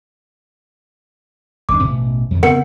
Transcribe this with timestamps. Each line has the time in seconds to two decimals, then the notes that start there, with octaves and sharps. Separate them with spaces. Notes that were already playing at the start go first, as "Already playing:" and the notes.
1.69 G1 D#2 D4 D6
1.83 A1 B2
2.31 F2 D#3
2.43 C#3 B3 C4 A#4 F#5 C#7